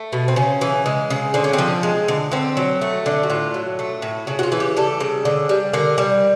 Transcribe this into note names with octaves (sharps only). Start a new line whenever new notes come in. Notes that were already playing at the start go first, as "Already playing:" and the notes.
Already playing: A3
B2
C4
C#3 C#4
E3
G#3
C#3
D3 C4
C#4
C4
F3
G#3
D3
D3 C4
F#3
A3
D3
F#4
A2 F4
F#3
A3
A2
C#3 F#4
F#4
F4
E3
G4
G3 A4
C#3
D3
G3
D3 A#4
G3